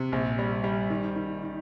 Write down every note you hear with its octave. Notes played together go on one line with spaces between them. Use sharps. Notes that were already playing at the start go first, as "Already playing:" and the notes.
Already playing: C3
A#1
G3
G3
D#3
D#3
D#3